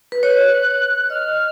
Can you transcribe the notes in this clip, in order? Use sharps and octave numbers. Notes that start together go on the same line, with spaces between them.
B4
C#5 F#6
D#5 F6